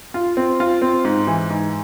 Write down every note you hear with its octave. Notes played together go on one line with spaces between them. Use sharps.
F4
C4
F4
C4
G#2
E3
G#2